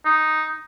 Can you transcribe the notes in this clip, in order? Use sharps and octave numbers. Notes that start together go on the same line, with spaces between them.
D#4